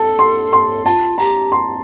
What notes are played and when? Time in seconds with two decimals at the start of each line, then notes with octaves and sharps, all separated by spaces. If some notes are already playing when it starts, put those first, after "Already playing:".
Already playing: A4 A5
0.19 C6
0.53 C6
0.85 F4 A5
1.18 G4 A#5
1.52 C6